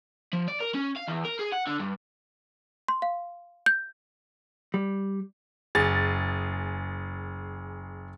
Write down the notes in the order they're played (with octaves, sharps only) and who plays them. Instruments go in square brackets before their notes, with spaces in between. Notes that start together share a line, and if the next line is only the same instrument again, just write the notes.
[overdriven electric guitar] F3
D5
A#4
C#4
F5
E2
A#4
G#4
F#5
D3
G2
[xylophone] C6
F5
G6
[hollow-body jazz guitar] G3
[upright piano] F#1 G#4 A6